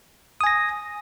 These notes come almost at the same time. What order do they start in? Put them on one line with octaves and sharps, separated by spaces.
D#6 G#5 A#6